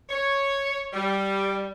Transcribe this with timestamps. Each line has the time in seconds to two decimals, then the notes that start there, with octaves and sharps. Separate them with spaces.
0.09 C#5
0.93 G3